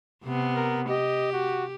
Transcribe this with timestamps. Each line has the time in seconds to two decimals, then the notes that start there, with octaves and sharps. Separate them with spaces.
0.24 C3 B3
0.55 A#4
0.89 G4 D#5
1.33 F#4